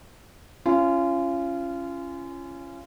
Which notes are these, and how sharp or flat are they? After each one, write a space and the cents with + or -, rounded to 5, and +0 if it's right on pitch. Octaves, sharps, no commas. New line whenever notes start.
C#4 +0 F4 -30